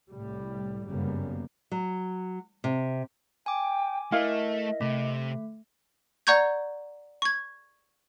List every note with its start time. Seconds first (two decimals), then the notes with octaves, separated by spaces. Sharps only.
0.11 C2 A2 G3
0.87 G1 F#2 C#3 G3 A#3 B3
1.71 F#3
2.64 C3
3.46 G5 G#5 D6
4.12 A3 E4 A#4 D#5 F5
4.81 C3 A3
6.27 D5 F#5 A#5 C#6 G6 G#6
7.22 C#6 G#6